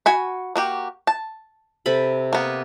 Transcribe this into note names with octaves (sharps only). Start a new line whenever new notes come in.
F#4 G#5 B5
A#3 F#4 G4
A5
C3 A4 B5
A#3 B3